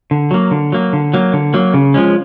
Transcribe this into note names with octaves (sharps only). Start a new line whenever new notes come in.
D3
F#3 A#3
D3
F#3 A#3
D3
F#3 A#3
D3
F#3 A#3
C#3
F3 G#3 C#4